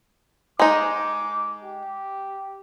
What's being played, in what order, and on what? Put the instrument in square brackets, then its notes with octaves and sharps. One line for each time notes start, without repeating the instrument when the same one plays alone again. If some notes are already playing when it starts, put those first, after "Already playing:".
[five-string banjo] G#3 D#4 [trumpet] D6
[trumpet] G4